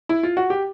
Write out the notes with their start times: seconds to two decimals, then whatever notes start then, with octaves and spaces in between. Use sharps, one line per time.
0.09 E4
0.23 F4
0.37 F#4
0.50 G4